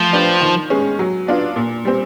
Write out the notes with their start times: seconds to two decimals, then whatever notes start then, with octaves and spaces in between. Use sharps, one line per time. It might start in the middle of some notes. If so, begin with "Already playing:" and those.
Already playing: F3 A3
0.13 D4 G4 B4
0.41 D#3
0.70 G#3 C#4
0.99 F#3
1.27 B3 D4 F4
1.56 A#2
1.85 G3 C4